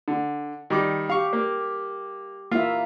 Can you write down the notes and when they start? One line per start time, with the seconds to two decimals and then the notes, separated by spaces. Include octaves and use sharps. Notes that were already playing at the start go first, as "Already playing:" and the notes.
0.08 D3
0.70 D#3 G3 D6
1.09 G4 F5 C#6
1.33 A#3
2.51 A#3 E4 F4 E5